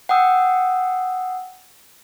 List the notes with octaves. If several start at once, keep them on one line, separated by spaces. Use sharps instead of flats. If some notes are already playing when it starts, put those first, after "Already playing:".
F#5 G5 D#6 E6